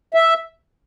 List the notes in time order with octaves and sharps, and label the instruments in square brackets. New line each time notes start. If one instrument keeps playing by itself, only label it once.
[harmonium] E5